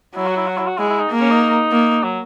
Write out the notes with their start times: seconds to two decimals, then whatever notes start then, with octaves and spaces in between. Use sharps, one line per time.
0.16 F#3 E4
0.27 F#4
0.37 E4
0.47 F#4
0.58 E4
0.67 F#4
0.78 G#3 E4
0.89 E4
0.99 D#4
1.10 A#3
1.21 C#4
1.31 D#4
1.72 A#3
2.03 F#3